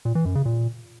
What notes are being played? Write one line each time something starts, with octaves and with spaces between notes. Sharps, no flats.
A#2
E3
F#2
C#3
A#2